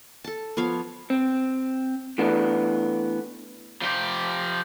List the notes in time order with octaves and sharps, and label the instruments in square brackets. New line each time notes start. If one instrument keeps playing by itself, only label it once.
[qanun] A4 A5
F3 B3 C#5 F5
[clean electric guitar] C4
E3 A3 B3 D4
[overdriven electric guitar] F3 G4